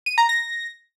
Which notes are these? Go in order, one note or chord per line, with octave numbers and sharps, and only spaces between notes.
D#7
A#5
A#6